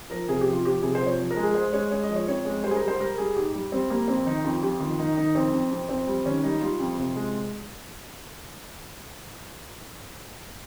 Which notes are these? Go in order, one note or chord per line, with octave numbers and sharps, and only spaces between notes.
F3 A#4
C3 G#4
G4
F3
F4
F3 G4
C3 G#4
C5
F3
C#5
F3
A#4
G#3
G#4
G#3 C5
G#3 C#5
G#3 C#5
D#5
F3
C#5
F2 C#5
G#3 C#5
G3 C5
G#4
A#4
G3
C5
G3 A#4
G3 G#4
G#2 G4
G3
G3 C4
G3 A#3
F2 C4
D#3 D#4
F2 F4
F2 G4
D#3 F4
D#3 D#4
D#3 D#4
F2 C4
F2
F2
F2 C4
G3
D#3 C#4
G3 D#4
G3 F4
F2
C3
G#3